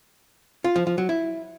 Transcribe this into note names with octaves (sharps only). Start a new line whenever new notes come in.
F4
F3
F3
F#3
E4